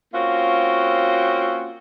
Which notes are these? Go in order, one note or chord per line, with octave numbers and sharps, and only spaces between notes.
A#3 C4 C#4 F4 F#4